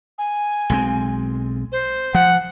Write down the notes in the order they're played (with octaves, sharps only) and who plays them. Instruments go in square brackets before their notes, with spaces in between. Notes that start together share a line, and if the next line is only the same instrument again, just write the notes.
[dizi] G#5
[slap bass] B1 G#3 C4
[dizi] C5
[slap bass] F3 [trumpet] F#5